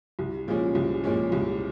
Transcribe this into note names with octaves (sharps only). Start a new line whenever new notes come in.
C2
A#2 F3 G#3 C#4
C2
A#2 F3 G#3 C#4
C2